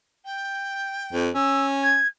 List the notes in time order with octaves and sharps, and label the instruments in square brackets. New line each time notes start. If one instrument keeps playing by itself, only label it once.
[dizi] G5
[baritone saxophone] F2
[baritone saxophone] C#4 [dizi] E6
[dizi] G#6